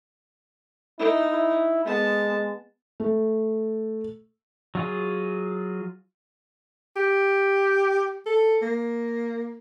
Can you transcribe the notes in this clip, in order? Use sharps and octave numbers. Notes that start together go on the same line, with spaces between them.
D#4 E4
E4
G#3 B3 A5
A3
F#3 F4 G#4
G4
A4
A#3